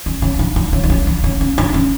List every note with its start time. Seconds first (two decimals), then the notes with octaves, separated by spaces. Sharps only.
0.06 C#4
0.22 C#4
0.39 D4
0.56 D4
0.73 C#4
0.84 D4
0.90 C#4
1.07 D4
1.24 C#4
1.41 C#4
1.58 D4
1.74 C#4